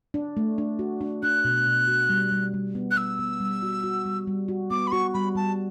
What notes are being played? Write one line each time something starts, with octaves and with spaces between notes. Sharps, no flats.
D4
A3
D4
F#4
D4
D4 F#6
B2
B2
F#4
G3
G3
G3
B3
F#6
B3 E6
B3
G3
F#4
F#4
G3
G3
F#4
B3 D6
B5
F#4 C#6
G3 B5
G3 A5